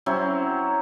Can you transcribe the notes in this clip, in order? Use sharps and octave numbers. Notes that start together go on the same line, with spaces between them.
F#3 C4 C#4 E4